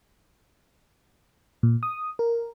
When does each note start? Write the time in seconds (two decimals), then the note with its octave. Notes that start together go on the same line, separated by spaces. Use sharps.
1.63 A#2
1.83 D#6
2.19 A#4